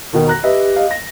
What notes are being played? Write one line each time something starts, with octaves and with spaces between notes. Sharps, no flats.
D#2 B2 D#3 A#4
A#5 F#6 A#6
G4 B4 D#5 E5
D#5 F5
A#6